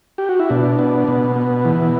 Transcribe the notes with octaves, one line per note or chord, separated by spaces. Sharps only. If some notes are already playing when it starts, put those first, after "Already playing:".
G4
F#4
E4
B2 D4
B3
B2
B3
E3